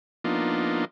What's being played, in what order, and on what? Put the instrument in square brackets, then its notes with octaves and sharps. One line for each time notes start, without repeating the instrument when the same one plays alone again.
[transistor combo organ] F3 A#3 B3 D4 D#4 F4